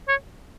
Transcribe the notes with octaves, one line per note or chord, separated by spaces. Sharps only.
C#5